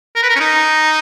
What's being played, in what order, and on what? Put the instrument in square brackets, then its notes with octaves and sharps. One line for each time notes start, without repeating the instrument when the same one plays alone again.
[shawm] A#4
B4
A#4
C#4
D#4